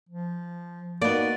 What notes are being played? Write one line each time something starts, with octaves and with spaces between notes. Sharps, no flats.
F3
A#3 B3 D#4 F#4 D5